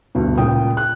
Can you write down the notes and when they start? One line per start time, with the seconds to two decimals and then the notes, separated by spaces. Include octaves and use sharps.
0.15 D2 G2 B2
0.38 C#2 A#2 G5 D#6
0.77 F#6